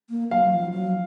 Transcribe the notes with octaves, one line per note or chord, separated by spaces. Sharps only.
A#3
F#3 F5
F3
F#3